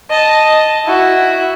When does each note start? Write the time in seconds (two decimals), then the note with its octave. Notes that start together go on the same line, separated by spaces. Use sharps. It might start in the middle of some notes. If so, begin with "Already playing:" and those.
0.10 D#5 A5
0.85 E4 F#4